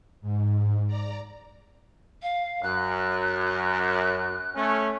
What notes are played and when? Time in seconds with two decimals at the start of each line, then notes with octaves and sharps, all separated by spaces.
0.21 G#2
0.87 D5 A#5
2.22 F5
2.63 F#2 F#6
4.56 A3 C#4